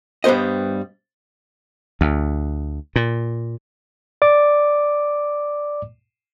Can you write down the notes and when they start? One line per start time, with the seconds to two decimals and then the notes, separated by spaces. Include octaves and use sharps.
0.24 G2 G3 B3 C5 D#5
2.01 D2
2.96 A#2
4.22 D5 D6